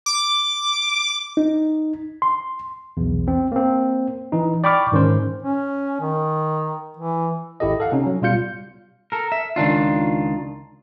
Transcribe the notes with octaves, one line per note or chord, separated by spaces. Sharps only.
D6
D#4
C6
B1 E2
C4
A#3 C4
E3 D#4
D5 G5 B5 C#6 D6 F6
G#2 D#3 C#4 C5
C#4
D#3
E3
G#1 E4 G4 A4 D#5
A4 F5 F#5
C3 C#4 D#4
F#3 C#4
B2 G3 F4 F5 G6 C#7
A4 A#4
E5
C#2 D#3 D4 F4